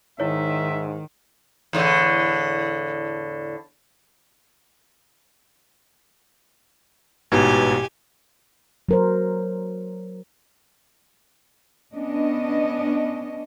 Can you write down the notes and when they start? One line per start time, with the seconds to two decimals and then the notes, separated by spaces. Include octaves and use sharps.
0.20 G#2 D#3 E4 C#5 E5
1.73 E2 A2 D3
7.32 A1 G#2 B2 G4 G#5
8.89 F#3 A#4 C5
11.93 B3 C#4 D4 D#5